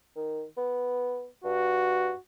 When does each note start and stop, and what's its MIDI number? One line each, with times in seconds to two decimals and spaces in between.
0.16 0.43 51
0.57 1.26 59
1.44 2.10 43
1.44 2.18 66